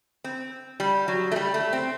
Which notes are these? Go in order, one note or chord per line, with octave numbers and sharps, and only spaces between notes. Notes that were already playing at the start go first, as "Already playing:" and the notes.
C4
G3
F#3
A3
G3
A3
C4